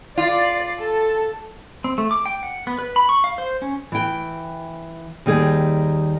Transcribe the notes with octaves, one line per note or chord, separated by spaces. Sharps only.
F4 D5 C7
A4
C4
A3
D6
G5
F#5
B3
B4
B5
C#6
F5
C5
C#4
E3 G5
D#2 D#3 G3 G#4